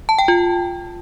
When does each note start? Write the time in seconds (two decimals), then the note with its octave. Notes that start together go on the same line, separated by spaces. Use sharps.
0.09 A5
0.19 G5
0.28 F4